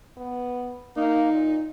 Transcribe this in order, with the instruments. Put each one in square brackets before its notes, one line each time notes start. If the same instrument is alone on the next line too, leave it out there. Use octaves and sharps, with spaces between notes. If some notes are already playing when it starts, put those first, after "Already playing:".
[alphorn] B3
[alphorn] A#3 [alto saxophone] D#4
[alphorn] A#2